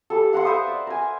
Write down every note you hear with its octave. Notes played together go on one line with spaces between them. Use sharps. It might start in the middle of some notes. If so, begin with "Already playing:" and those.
G3 A4
F5 F#5 A#5 C6
B4 C5 E5 D#6
D5
A#4 G#5